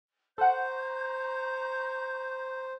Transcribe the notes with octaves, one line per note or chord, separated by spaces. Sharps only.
A4 C5 F#5 A#5 C#6 G6